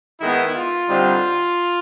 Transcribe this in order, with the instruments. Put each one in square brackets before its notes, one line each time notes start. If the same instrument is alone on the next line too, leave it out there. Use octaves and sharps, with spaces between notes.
[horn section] D#3 G#3 B3 E4
F4
D3 G3 C4 D#4